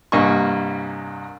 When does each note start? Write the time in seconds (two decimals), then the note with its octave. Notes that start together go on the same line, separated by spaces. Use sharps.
0.12 C2 G2 A#3 D#5 G#5 C#6